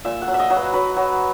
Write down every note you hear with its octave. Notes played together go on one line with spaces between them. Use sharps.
A#2 E5
F#5
F#3
E5
D#5
F#3
B4
F#3 B4
F#3